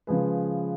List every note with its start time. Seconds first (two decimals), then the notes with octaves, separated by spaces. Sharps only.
0.07 C#3 F3 G#3 G#4 B4